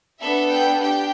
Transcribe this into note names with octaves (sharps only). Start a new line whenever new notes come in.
B3 D4 A4 E5
G5
D4 G4 G5